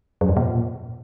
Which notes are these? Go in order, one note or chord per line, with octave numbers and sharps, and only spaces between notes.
F#2
F2
A#2